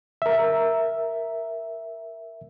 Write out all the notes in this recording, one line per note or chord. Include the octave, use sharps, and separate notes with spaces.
A#4 E5